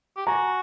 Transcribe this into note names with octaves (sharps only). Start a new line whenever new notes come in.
G4
F#4 G#5 A#5